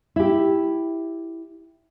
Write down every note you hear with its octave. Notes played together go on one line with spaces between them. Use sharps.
E4 G4